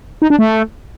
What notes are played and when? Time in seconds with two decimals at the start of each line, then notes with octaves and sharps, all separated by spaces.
0.22 D#4
0.30 D4
0.39 A3